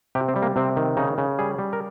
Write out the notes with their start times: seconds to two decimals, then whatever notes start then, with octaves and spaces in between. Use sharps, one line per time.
0.15 C3 G4
0.28 C4
0.36 G3
0.42 A#3
0.56 C3 C4
0.77 D#3
0.97 C#3 D#4
1.18 C#3
1.39 G3 G#4
1.59 G3
1.73 A#4